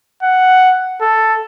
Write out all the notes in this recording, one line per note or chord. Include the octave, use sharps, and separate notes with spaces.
F#5
A4